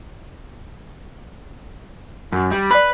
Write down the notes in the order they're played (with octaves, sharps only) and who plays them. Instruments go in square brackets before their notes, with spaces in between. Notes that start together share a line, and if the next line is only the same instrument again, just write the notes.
[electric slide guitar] F#2
G3
[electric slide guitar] B4 [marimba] D5 B5